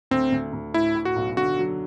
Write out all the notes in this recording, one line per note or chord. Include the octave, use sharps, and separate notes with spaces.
D2 C4
D2
D2
A2 E4
A2
F#4
B1
D3 F#4
F#3